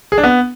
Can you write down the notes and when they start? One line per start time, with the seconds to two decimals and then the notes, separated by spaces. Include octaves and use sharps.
0.12 G#4
0.18 D4
0.24 B3